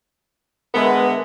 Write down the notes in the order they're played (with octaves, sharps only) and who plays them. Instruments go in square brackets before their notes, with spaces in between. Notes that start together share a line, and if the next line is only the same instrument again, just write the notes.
[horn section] D3 G#3 B3 [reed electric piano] A#4 B4 E5